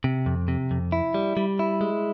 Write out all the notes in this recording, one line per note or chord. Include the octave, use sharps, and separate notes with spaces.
C3
F2
C3
F2
E4
G3
G3
E4
G#3